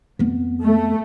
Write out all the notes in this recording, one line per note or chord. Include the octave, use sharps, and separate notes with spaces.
F2 B3
A3